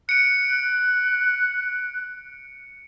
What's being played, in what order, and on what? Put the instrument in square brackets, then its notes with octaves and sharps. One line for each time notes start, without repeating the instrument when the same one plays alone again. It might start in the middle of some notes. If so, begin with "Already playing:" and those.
[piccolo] F#6 [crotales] C#7 D7